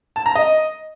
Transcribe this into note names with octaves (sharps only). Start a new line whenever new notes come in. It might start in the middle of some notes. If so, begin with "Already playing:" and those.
A5
A#5
D#5